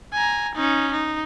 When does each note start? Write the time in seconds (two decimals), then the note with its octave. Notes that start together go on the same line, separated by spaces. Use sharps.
0.13 G#5 A#5
0.55 C#4 D#4
0.92 D#4